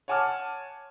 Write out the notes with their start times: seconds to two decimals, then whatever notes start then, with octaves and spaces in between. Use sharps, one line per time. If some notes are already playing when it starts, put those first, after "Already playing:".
0.08 C#5 F#5 G#5 A5 D6 F6